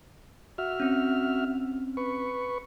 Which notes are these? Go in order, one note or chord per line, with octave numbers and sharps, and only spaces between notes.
F#4 E5 F6
C4 C#4
B4 C#6